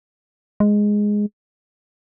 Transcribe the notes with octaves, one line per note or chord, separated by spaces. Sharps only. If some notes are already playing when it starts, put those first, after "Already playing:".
G#3